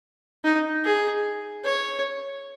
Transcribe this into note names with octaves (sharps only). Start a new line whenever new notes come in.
D#4
G#4
C#5